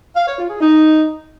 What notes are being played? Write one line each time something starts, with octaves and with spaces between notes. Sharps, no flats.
F5
C#5
F4
G#4
D#4